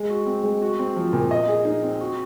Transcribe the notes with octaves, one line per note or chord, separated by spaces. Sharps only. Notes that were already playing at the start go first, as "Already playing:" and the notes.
Already playing: G#3
F#4
C4
G#3
F#4
C4
F3
A#2
D#5
G#4
D#4
C4
F#4